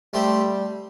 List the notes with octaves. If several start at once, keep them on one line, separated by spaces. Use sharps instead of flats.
G3 A3 C4 G4